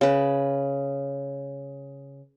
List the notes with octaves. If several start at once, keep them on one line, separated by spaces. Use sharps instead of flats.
C#3 B4